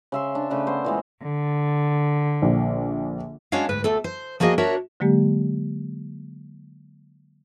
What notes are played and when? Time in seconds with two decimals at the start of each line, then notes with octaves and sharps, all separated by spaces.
0.12 C#3 E5 C6
0.35 D4
0.50 C#3 A3 D4 B4
0.67 B3 C5
0.84 A#2 E3 G#3
1.23 D3
2.42 A#1
3.52 G#3 C#4 D4 F#4 C#5 F5
3.69 D2 G#2 B4
3.84 D2 A3 A4
4.04 C5
4.40 F3 A#3 F#4 G#4 D#5
4.58 D4 F#4 A#4 C#5 E5
5.00 D3 F#3 G#3 A#3 G4